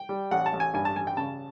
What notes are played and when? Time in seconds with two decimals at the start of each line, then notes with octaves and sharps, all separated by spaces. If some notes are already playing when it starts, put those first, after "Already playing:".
Already playing: G5
0.09 G3
0.31 A1 F#5
0.46 A5
0.53 A1
0.60 G#5
0.74 G2 G#5
0.85 A5
0.96 A1 G#5
1.07 G5
1.17 C#3 A5